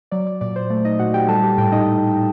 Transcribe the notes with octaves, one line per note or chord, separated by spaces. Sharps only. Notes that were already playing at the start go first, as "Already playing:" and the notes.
F#3 D5
D5
A#2 D5
C5
A3 D5
D#4 D#5
A#2 F#4 F#5
G4 G5
G3 A4 A5
G4 G5
A2 G4 G5
D#4 D#5